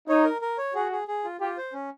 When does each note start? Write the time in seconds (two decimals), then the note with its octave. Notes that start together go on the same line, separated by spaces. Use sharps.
0.08 D#4 C#5
0.25 A#4
0.42 A#4
0.58 C#5
0.75 F#4 G#4
0.92 G#4
1.08 G#4
1.24 F4
1.41 F4 G4
1.57 C5
1.73 C#4